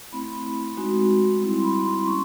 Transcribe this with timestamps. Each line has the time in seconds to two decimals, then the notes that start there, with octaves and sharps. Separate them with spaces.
0.12 A3 C4 E4 B5
0.77 G#3 C4 D#4 F#4
1.42 G3 C4 E4 C6
1.63 B5
1.86 C6
2.07 A#3 C#4 C#6